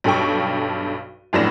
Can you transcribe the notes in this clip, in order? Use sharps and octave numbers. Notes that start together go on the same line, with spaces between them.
B1 G2 A4 G5 C#6
F1 F#2 A2 D4 A#6 E7